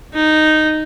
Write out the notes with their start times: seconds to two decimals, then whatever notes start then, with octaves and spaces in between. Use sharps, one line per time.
0.14 D#4